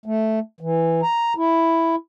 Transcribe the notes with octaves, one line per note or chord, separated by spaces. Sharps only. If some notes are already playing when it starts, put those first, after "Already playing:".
A3
E3
A#5
E4